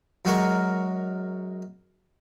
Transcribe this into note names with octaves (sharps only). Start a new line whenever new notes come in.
F#2 F#3 G#3 F#4 A#4 C#6